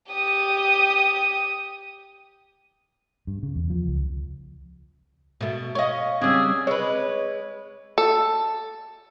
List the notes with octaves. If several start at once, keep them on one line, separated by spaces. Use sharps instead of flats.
G4 D#6
G2
C#3
E2
F3
C#2
B2 A3
C#5 D#5 F5 C#6
C#3 G3 C4 G#4 D6 E6
G#3 B4 C#5
A4